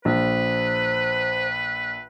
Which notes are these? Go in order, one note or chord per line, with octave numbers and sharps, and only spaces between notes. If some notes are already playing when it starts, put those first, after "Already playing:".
A#1 B4 C5